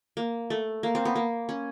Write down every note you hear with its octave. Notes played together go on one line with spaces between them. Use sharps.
A#3
A3
A#3
C4
B3
A#3
C#4